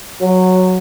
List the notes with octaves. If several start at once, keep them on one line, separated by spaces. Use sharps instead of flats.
F#3